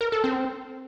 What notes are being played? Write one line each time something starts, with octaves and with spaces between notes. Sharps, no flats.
A#4
A4
C4